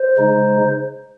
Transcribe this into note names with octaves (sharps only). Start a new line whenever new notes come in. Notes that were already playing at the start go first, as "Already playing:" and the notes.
Already playing: C5
C#3 G#3 D#4